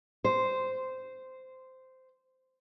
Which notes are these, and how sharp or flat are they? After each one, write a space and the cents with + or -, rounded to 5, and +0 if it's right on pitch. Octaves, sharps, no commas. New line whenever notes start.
C5 -10